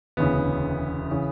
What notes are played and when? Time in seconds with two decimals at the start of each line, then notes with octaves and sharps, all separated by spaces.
0.17 E1 D2 C#3 E3 B3
1.11 C#3 E3